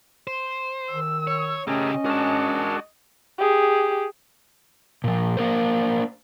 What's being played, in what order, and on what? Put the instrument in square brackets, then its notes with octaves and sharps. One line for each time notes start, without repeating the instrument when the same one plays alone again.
[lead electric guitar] C5
[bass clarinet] D#3 [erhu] E6
[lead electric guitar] C#5
[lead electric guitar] C#3 G4 [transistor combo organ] A3 G#4 A#4 [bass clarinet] C#4 [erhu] D#5
[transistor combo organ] G#3 D4 F#4 [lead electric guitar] A#4 A5
[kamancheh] G4 G#4
[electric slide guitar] A#2 F3
A#3 D4 A#4 C5